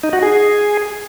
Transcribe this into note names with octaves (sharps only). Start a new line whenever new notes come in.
D#4
F#4
G#4